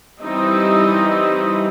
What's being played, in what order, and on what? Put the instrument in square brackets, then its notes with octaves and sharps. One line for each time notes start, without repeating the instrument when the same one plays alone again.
[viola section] E3 G3 C4 D#4 E4